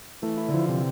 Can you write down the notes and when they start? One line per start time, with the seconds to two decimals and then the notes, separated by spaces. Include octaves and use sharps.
0.22 E3 A3
0.38 E4
0.48 D3
0.53 E3 F3
0.69 C3